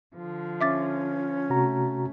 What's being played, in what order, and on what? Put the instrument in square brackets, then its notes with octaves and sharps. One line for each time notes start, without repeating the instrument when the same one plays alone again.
[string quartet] D3 F3
[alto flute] C#4 [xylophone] E5 D6 A6
[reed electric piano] C3 F#4 A#5 [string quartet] A3